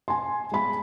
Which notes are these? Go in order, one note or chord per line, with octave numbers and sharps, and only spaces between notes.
G#5 C6
G#3 B5